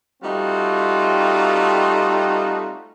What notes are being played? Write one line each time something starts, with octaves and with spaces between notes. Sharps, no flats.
G3 A3 C4 D#4 F4 F#4